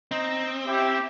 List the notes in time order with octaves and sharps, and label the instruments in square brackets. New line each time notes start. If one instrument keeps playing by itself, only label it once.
[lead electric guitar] C4 [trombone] D#4
[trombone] E4 [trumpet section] G4